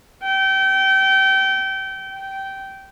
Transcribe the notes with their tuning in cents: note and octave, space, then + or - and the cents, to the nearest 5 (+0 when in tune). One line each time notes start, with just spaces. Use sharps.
G5 -30
G5 -15